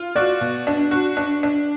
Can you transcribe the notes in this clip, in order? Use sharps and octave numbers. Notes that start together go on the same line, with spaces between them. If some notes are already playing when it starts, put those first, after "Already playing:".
Already playing: F4
F#4 D5
B2
D4
F#4
D4
D4